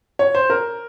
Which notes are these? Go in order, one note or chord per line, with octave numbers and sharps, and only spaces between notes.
C#5
C5
A#4